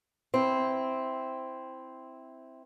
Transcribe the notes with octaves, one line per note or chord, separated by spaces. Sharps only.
C4 E4